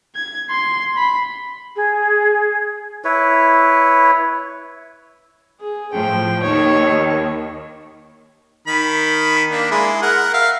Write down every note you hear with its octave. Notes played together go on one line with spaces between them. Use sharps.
G#6
C6
B5
G#4
E4 B4 C#5
G#4
A2 F3 G5
D#2 D#3 C#5 C#6
D#3 B5
A#3 D4
G#3 E4
A#4 F#5
E5 F5